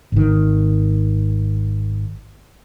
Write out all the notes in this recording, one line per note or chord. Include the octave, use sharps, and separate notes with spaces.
G#1 D#3